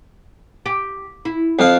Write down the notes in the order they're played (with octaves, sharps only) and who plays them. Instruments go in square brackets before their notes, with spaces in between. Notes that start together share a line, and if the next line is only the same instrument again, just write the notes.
[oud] G4
E4
[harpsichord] F2 F5